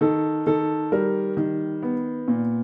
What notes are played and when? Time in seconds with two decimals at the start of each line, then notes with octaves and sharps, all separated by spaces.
0.01 D#3 A4
0.46 D#3 A4
0.92 G3 A#4
1.37 D#3
1.83 B3
2.28 A#2